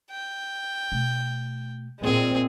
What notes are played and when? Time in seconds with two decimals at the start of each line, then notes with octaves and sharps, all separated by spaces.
0.11 G5
0.92 B2 A3
2.00 A#2 G#3 C4 G#4